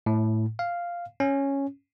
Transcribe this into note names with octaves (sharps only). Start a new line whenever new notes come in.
A2
F5
C#4